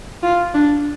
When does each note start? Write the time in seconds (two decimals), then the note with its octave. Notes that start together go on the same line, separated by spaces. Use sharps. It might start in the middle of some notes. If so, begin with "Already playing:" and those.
0.23 F4
0.54 D4